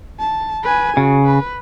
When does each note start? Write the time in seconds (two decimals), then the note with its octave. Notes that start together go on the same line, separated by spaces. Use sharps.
0.20 A5
0.63 B4 G#5
0.97 C#3 F#4
1.26 B4